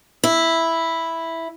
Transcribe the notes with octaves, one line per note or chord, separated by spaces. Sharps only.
E4